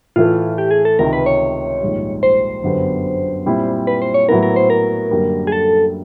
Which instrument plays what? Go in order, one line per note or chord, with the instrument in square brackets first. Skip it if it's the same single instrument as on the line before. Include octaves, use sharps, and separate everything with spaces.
[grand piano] A2 E3 A3 [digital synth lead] F4
[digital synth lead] G4
G#4
A4
[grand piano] C#2 C3 D#3 [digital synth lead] A#4
[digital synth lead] B4
C#5
[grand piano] A#1 G#2 D#3 G3
[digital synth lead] C5
[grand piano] G1 F#2 D3 G3 B3
A#2 G3 C4 E4
[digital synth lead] B4
C5
C#5
[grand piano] A2 F#3 B3 E4 [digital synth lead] A#4
[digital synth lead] A#4
C5
A#4
[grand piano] F#2 D3 G3 A#3
[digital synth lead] G#4
A4